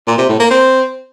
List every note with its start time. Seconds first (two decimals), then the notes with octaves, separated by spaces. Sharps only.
0.07 A#2
0.18 C3
0.29 A2
0.40 A#3
0.51 C4